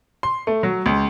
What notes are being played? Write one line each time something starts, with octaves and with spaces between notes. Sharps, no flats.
C6
A3
F#3
C#2